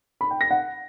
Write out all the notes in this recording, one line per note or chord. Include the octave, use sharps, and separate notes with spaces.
B5
G5
A#6
F#5